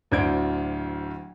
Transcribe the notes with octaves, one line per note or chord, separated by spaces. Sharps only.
D1 D2 D4 C5 G#6 D7